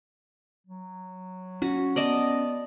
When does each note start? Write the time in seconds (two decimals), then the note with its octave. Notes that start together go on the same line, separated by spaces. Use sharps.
0.67 F#3
1.62 C#4 F#4
1.96 B3 D5 D#5 A5